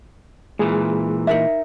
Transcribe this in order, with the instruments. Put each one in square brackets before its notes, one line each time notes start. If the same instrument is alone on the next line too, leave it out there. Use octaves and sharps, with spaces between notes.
[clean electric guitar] A#2 E3 [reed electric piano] G#3 G#4
[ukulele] D#4 A#4 E5